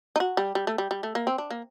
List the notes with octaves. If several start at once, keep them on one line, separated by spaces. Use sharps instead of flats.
D#4
F#4
G3
G3
A3
G3
G3
A3
A#3
C4
D4
A#3